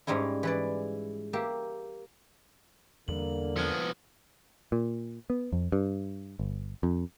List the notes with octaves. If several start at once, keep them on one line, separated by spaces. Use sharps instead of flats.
G#2 G3 G#3 C#4 E4
E3 B4 D5
A#3 G4 E5
E2 D3 G3 A#3 F#7
F3 B3 F6 G#6 C#7
A#2
B3
F2
G2
G1
F2